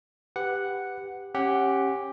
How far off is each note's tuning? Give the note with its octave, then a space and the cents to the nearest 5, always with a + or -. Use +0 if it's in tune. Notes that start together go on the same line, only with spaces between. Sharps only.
G4 +10 B4 +15 F#5 +0
C#4 -20 G4 +0 F#5 +10